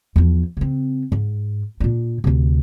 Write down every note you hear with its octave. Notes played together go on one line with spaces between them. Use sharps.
E2 F3
C#3 C4
G#2
A#2 D4
D2 C3